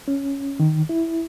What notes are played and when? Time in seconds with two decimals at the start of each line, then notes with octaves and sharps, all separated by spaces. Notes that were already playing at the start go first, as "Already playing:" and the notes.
0.08 C#4
0.60 D#3
0.89 E4